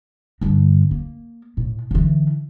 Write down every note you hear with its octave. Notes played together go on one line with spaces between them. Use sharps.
G2 D3
A#3
A2
D3 E3